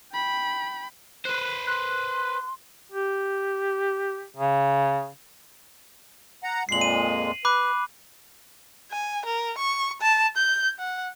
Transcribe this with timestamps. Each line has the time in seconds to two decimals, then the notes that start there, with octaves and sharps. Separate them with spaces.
0.13 G5 B5
1.25 B4 C5 F#6
1.67 C6 F#6
2.92 G4
4.36 C#3
6.43 F#5 A#5
6.69 F2 A#2 G#3 C7 F#7
6.81 D#7
7.45 B4 B5 D6 F#6
8.91 G#5
9.25 A#4
9.58 C#6
10.01 A5
10.37 G6
10.79 F#5